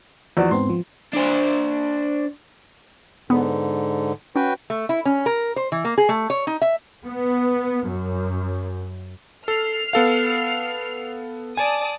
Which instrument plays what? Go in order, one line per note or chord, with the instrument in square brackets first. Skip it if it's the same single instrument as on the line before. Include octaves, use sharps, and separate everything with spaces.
[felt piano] E2 F#4 D5 [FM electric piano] F3
[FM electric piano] G#2 B3 C4 [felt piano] C6
[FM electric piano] F3
[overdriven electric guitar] D4 C5
[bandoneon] G#2 D3 [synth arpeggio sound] B3
[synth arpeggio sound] C#4 [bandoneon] F#4 B4 G5
[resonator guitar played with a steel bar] A3
E4
C#4
A#4
C5
E3
A#3
G#4
A3
C#5
D#4
E5
[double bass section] B3
F#2
[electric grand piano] A4 [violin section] F6 C7
[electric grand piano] B3 A4 F5
[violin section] D5 A5 D#6 [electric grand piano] G#5